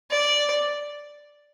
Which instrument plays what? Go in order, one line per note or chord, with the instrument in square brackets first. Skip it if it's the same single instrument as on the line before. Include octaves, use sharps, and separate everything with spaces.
[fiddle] D5